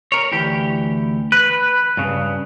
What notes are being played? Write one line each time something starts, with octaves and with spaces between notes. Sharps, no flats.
A#4 C#5
D2 E3 G4
B4 F#6
G2 C#3